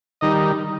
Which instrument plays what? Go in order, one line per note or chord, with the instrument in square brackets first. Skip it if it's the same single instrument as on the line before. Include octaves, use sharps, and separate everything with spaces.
[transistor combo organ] D#3 G3 D#4 D#5